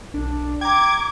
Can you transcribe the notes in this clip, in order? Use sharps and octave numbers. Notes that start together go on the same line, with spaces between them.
B1 D4
G5 A#5 D6 G#6 D7